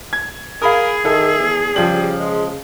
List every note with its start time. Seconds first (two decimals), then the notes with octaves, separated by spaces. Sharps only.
0.13 G#6
0.62 G#4 A#4 F5 B5 D#6
1.05 D#3 A4 E5
1.39 E2
1.76 C#3 F3 G3 F#7
2.20 G#3